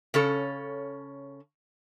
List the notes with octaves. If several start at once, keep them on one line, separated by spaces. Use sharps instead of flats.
C#3 C#4 A4